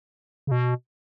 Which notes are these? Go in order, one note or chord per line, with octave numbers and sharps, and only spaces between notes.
C#3
B2